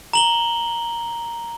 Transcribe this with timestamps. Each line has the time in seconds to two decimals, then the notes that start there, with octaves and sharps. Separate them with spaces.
0.13 A#5 F#7 G7